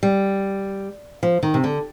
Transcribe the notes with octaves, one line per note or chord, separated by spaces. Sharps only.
G3
F3
D#3
C3
D3